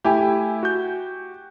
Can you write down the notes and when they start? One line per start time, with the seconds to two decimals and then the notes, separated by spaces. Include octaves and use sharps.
0.04 A3 E4 G4 G#5
0.63 F#4 G6